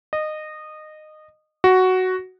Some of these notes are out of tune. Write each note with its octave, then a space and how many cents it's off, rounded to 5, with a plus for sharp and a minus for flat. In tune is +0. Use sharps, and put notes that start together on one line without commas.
D#5 -20
F#4 +5